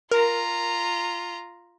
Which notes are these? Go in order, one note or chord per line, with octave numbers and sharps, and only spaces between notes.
F4 A#4 A#5